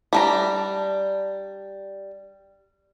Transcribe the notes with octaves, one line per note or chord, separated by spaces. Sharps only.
G3 D4 A#5